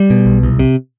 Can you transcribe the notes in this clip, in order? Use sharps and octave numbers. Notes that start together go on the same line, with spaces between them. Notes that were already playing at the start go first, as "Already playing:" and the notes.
Already playing: G3
B2
B1
C2
C3